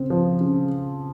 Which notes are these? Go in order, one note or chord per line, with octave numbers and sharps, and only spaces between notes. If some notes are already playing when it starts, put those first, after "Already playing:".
Already playing: C#3 C4
F3
C#3